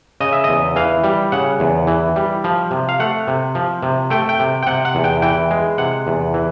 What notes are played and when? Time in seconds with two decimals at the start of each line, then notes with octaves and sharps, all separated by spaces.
0.20 C#3 D#5
0.33 E5
0.44 E2 D#5
0.76 E3 F5
1.04 G3
1.32 C#3 F#5
1.60 E2
1.87 E3
2.16 G3
2.44 F3
2.71 C3
2.89 F5
3.00 A3 F#5
3.28 C3
3.55 F3
3.83 C3
4.10 A3 G5
4.29 G5
4.39 C3
4.63 G5
4.67 C3 F#5
4.85 F#5
4.95 E2
5.04 G5
5.22 E3 G5
5.51 G#3
5.78 C3 F#5
6.07 E2
6.34 E3